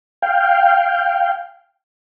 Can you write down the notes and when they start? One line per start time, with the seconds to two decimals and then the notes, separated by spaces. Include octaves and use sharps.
0.22 F5 G5